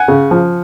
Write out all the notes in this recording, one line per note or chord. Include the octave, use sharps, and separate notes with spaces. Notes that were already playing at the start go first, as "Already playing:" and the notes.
Already playing: F#5 G#5
C#3
F3